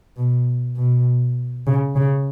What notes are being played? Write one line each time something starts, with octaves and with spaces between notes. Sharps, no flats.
B2
B2
C#3
C#3